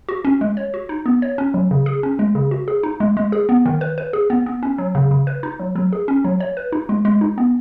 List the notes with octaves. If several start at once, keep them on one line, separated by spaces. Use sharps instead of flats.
F#4
C#4
G#3
C#5
F#4
D#4
B3
C#5
C#4
F#3
C#3
G#4
C#4
G#3
C#3
F#4
G#4
D#4
G#3
G#3
G#4
B3
D#3
B4
B4
G#4
B3
B3
C#4
F#3
C#3
C#3
B4
D#4
F#3
F#3
G#4
C#4
F#3
C#5
B4
D#4
G#3
G#3
D#4
B3